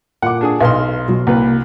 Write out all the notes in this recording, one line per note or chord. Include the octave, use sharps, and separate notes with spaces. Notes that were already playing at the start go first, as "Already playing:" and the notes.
A#2 F#5 D6
D4 G#4 D#6
B1 B4 F5 C6 F6
B2 F#3
C2 A#3 B4